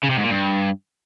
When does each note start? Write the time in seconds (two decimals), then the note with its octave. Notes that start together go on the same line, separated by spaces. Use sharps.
0.04 C#3
0.11 C3
0.17 G#2
0.24 A#2
0.30 G2